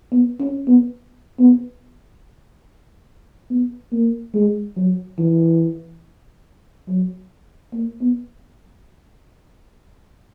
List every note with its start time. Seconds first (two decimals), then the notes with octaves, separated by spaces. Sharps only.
0.12 B3
0.40 C#4
0.68 B3
1.39 B3
3.51 B3
3.92 A#3
4.35 G#3
4.76 F#3
5.19 E3
6.88 F#3
7.73 A#3
8.01 B3